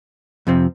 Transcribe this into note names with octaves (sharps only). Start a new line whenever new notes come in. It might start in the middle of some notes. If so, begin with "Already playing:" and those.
F2 C3 F3 C4